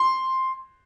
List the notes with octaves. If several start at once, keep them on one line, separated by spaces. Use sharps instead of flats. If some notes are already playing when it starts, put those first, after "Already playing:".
Already playing: C6